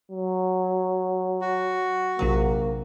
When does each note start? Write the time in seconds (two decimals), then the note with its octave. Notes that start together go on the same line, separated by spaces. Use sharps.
0.12 F#3
1.41 F#4
2.19 A#1 C3 F#3 A#3